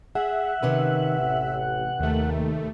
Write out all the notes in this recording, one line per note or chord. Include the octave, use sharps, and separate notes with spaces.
G#4 E5 F#5
C3 D#3 C#4 B4
A1
D#2 D#3 A3